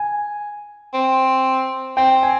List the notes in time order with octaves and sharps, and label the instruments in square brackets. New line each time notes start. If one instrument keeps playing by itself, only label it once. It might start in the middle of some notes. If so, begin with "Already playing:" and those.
Already playing: [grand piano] G#5
[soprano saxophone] C4
[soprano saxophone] C4 [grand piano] G5
[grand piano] G#5